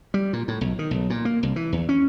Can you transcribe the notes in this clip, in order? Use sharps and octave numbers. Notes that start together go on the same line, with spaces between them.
G3
A#2
A2
B1
D#3
B1
A#2
A#3
C2
E3
E2
C#4